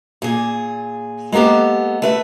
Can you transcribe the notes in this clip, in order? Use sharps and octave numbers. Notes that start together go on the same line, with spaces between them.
A#2 G#4
G#3 A#3 B3 G4 A4
A3 B4 E5